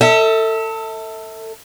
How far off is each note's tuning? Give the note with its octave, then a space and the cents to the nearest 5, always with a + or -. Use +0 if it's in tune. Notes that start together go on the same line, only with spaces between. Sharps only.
A4 +25 E5 -30